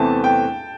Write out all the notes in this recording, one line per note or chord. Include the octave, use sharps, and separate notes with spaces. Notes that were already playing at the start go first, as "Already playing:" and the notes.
Already playing: E2 C3 E3 A3 C4 A5
G5